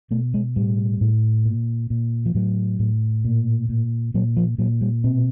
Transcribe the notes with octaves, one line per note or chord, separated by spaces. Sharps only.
B2 A3
G#3
A2 G3
A2
A#2
A#2
F3
A2 F#3
A2
A#2
A#2
A#2 F#3
F3
A#2 F#3
G3
B2 C4